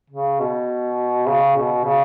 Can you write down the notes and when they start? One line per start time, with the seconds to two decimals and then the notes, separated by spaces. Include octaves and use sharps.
0.10 C#3
0.40 B2
1.27 C#3
1.56 B2
1.84 C#3